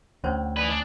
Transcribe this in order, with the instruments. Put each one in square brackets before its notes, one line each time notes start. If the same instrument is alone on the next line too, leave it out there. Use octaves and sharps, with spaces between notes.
[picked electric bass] D2 [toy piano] C#4 C5 C#5 [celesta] F#5 G5 G#6
[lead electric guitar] E4 B4 [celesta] D5 G#5 D#6
[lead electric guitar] D4